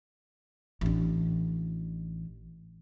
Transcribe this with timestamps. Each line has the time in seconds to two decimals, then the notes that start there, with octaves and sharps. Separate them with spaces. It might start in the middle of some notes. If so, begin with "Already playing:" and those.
0.81 A1 D4